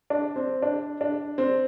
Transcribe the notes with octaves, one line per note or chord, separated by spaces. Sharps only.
D4
C4
D4
D4
C4